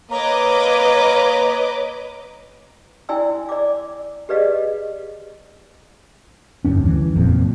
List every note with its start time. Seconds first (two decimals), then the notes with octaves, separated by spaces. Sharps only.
0.11 A#3 B4 C#5 D#5 A#5 D6
3.09 E4 D5 G5 G#5 C6 E6
3.49 D5 D6
4.29 G4 G#4 B4 D5 D#5 F5
6.65 F1 D2 G2 C#4
6.86 E3
7.16 F#1 F2 A#2